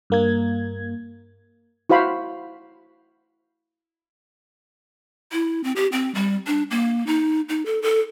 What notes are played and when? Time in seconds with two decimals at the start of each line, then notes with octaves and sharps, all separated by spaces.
0.10 G2 A#3 G#6
1.90 E4 F#4 C5 F5 B5
5.32 E4
5.64 C4
5.76 G4
5.92 C4
6.15 G3
6.47 D4
6.71 A#3
7.07 D#4
7.49 D#4
7.66 A4
7.82 A4